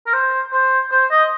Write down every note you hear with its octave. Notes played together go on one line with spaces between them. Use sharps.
A#4
C5
C5
C5
D#5